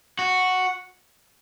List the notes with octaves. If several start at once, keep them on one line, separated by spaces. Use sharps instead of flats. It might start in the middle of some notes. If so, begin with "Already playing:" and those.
F#4